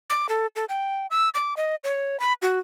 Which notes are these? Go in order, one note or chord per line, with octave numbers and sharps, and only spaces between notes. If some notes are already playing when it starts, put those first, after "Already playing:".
D6
A4
A4
G5
E6
D6
D#5
C#5
B5
F#4